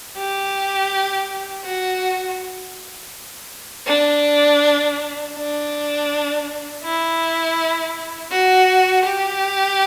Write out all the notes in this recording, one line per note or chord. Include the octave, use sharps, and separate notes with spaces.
G4
F#4
D4
D4
E4
F#4
G4